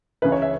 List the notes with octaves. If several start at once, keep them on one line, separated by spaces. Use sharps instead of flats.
C#2 C#3 E3 B4
C#5
E5